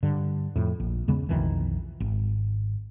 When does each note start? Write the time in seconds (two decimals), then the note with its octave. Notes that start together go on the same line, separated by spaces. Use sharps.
0.03 G2 D3
0.56 F2 A2
0.80 A#1
1.08 E2 C#3 G#3 B3
1.29 B1 F2 D#3 E3
2.00 G#1